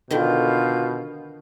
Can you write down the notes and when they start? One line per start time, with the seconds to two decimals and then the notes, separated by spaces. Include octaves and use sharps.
0.11 B2 D3 D#3 F4 G6